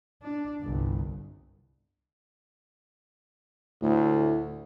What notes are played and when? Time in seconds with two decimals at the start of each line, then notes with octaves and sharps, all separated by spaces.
0.22 D4
0.62 G1 C2
3.82 D2 A2